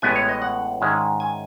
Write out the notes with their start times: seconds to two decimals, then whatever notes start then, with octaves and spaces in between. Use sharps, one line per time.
0.02 A1 A2 G#3 B3 E4 G#5
0.16 C#5
0.29 D#5
0.42 F#5
0.81 G#2 D#3 G#3 C#4 E4
1.20 G#5